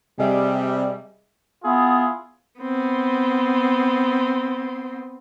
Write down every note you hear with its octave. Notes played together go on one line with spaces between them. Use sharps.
C3 G3 G#4 D#5 E5
B3 E4 F4 G#4
B3 C4